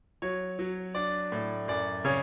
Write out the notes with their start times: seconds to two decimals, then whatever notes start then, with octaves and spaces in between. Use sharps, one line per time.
0.22 F#3 C#5
0.59 F#3
0.95 D4 D5
1.32 A2
1.68 F#2 D5
2.05 C#3 C#5